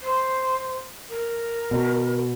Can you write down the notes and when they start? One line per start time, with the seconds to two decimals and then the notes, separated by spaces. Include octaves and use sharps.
0.01 C5
1.09 A#4
1.71 B2